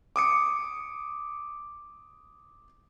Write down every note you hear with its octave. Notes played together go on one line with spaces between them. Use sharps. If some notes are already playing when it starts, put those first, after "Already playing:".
D6 D#6 C#7